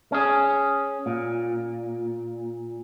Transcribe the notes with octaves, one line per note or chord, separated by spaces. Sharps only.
C#4 G#4
A#2